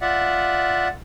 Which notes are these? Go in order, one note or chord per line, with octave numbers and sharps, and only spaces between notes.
F4 D5 E5 F#5